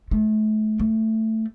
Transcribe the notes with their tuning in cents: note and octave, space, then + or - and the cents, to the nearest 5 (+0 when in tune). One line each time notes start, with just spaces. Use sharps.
A3 -35
A3 +10